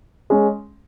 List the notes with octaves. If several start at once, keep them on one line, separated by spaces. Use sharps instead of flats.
G#3 C#4